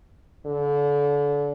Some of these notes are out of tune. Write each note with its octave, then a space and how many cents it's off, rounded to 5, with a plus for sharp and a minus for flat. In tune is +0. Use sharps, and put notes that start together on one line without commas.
D3 -30